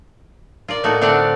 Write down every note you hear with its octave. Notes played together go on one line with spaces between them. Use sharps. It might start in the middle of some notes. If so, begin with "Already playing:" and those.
F4 A#4 D5
A2 A3 A#3 D#4 F#4
D3 A3 C4 D4 F5 F#5